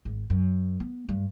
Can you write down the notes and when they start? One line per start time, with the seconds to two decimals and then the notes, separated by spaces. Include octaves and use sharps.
0.05 G#1
0.30 F#2
0.80 B3
1.09 G2